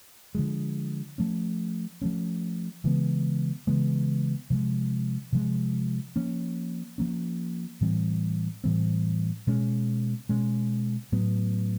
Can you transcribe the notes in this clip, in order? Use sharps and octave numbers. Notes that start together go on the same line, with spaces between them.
D3 F3 G#3
F3 A3 C#4
F3 A3 C#4
C#3 E3 G#3 B3
C#3 E3 G#3 B3
C3 F3 G#3
C3 F3 G#3
F3 A#3 C#4
F3 A#3 C#4
A2 E3 G3 C4
A2 E3 G3 C4
B2 G#3 C#4
B2 G#3 C#4
A2 F#3 B3